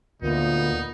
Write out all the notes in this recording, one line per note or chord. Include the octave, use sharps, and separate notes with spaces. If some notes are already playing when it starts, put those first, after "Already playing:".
D2 A#2 B3 D#4